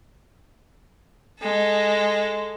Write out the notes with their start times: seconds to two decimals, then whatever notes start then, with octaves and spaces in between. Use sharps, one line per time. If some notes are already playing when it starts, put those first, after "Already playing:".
1.39 G#3 A4